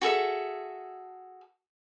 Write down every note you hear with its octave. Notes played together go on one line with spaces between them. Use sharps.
F#4 G#4 A4 E5